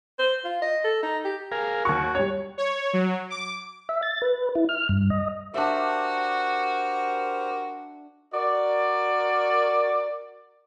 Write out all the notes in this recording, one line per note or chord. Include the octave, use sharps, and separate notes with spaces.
C5
F4
D#5
A4
D#4
G4
G#4 A#4 F5
D#2 F#4 C#6
G3 C#5
C#5
F#3
D6
E5
A6
B4
E4
F6
G2
D#5
D4 F#4 G4 A#4 C5 E5
F#4 A#4 D5